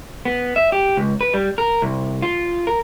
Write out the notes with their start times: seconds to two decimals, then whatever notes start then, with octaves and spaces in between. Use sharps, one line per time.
0.25 B3
0.56 E5
0.72 G4
0.97 C#2
1.21 B4
1.34 G3
1.58 A#4
1.82 C2
2.22 F4
2.67 A#4